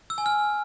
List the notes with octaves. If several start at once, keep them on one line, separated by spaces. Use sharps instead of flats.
E6
G#5
F6